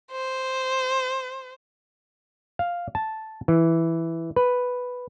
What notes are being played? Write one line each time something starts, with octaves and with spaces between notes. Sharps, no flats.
C5
F5
A5
E3
B4